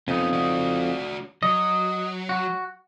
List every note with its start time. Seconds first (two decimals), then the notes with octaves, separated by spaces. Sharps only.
0.08 F2 B3 C#4 D#4
0.32 D4 F#4
1.43 F#3 D#5
2.29 F#4